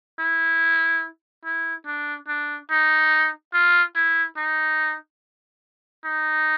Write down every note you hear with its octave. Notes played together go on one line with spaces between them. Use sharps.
E4
E4
D4
D4
D#4
F4
E4
D#4
D#4